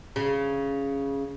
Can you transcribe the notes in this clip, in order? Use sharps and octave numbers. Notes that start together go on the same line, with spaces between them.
C#3